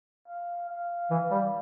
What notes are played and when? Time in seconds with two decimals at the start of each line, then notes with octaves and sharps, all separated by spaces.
0.28 F5
0.70 F5
1.10 E3
1.31 G3